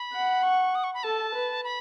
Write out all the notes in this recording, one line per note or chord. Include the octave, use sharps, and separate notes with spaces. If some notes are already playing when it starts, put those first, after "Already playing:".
Already playing: B5
F#5
C#6
D#6
C#6
B5
A4 A5
B4
B5